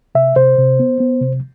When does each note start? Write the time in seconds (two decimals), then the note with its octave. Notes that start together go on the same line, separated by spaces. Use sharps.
0.15 C3 E5
0.36 C3 C5
0.58 C3
0.79 B3
1.00 B3
1.21 C3